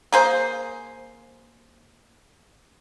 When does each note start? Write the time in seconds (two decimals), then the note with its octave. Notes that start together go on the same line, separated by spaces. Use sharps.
0.12 A#3 G#4 C5